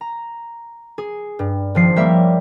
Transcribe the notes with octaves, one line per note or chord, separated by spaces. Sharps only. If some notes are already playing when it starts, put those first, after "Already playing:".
A#5
G#4
G2
G#1 F3 C7
G3 A#3 C#5 E5